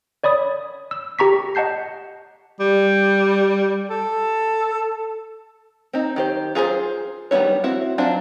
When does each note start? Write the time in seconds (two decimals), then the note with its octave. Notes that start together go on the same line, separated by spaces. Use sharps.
0.24 C#5 D5 B5 D#6
0.91 E6
1.19 G4 A#5 C#6 B6
1.55 D#5 F#5 A5 G6 C7
2.60 G3
3.90 A4
5.93 C4 D#4
6.16 D#3 G4 C5
6.55 F4 G#4 B4 C5
7.31 D#3 G3 B3 E4 C#5
7.64 C4 E4 F#4
7.98 F#3 C4 D4 F4